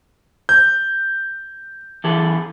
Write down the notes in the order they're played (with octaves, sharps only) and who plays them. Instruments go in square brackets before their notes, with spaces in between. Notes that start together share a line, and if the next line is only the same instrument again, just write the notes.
[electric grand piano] G6
[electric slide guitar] E3 G#4 A4